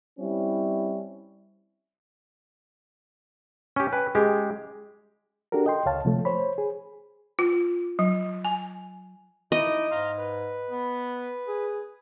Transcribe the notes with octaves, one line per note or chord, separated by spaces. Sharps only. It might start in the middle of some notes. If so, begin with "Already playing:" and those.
G3 C4 C#4 E4
C#4 G4 C#6
B4 G5 G#5
G#3 C#4 G4 G#4
D4 F#4 G4 A4 A#4
D#5 G5 C6
C#2 C#5 F5 A5
C3 F3 A3
C5 C#5 B5
G#4
F4
F#3
G#5
D#4 E4 D#5 D6
G#2 F5 A#5 C6
B4
B3
G#4